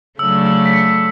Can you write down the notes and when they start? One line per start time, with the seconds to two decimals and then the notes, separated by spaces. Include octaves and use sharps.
0.19 C#3 F#3 A3 D4 E6
0.47 E6
0.66 B6
0.73 C#7